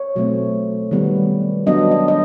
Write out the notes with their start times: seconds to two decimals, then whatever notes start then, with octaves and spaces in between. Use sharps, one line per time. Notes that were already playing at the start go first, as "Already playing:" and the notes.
Already playing: C#5
0.16 B2 F#3 A3 C4
0.91 D#3 G3 B3
1.66 F#3 B3 D4 D#5
1.91 D#5
2.08 D#5